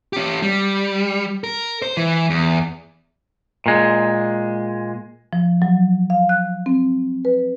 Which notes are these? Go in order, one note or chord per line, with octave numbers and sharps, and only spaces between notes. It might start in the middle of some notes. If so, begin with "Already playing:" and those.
C#4 G4
G3
A#4
C5
E3
E2
A#2 G#3
F3
F#3
F5
F#6
C4
B4